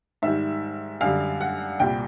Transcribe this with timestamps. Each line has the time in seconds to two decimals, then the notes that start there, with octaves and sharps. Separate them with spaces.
0.22 G#2 D#3 G3 E5
1.01 F#2 D3 G3 F5
1.41 F#5
1.80 C2 A#2 G3 G5